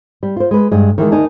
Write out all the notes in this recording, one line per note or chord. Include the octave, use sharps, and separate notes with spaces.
G3
F4 C5
G#3 B4
G2 G#3
D#3 E3 F#3 G#3
D2 D#3 D#4 D5 G#5 A5